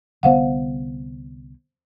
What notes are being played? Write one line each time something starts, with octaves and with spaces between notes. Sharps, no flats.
C2 D3 B3 C5 F5 F#5